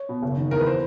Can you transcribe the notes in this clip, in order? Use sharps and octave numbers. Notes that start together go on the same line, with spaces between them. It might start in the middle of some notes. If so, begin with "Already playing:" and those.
Already playing: C#5
B2
F#1
D#3
E2 A#4
B4
C5